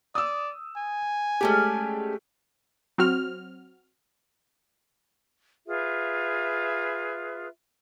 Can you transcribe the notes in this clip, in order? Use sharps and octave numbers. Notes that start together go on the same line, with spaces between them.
D5 D#6 E6
G#5
G#3 A3 C#4 G4 A4 D5
F#3 C4 F#4 F6
F4 G#4 B4 E5